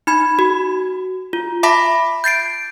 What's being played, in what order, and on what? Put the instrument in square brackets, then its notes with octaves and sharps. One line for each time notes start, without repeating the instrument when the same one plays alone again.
[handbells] D#4 B5 G#6
F#4
F4
E5 A5 B5 D6 A#6 B6
G6 A6 C7 D7